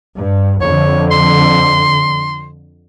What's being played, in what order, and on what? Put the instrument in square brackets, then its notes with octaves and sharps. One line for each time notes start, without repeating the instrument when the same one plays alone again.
[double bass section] G2
[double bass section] F2 D3 [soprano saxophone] C#5
[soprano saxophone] C6